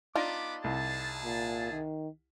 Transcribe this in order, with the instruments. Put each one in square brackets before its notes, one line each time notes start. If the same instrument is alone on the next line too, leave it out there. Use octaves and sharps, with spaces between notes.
[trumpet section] B3 B5 D6 [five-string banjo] D4 D#4 F4
[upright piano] C2 [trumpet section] G#4 A5
[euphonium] A#2
D#3